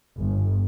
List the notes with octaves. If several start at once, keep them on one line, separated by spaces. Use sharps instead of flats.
G1